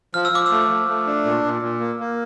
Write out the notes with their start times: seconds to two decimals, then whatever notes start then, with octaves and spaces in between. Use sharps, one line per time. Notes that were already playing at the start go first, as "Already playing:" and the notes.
0.14 F3 F6
0.25 E6
0.32 F3 D6
0.46 A3 E6
0.69 F3
0.88 A3
1.07 D4
1.25 A#2
1.44 A#2
1.62 A#2
1.80 A#3
1.99 A#3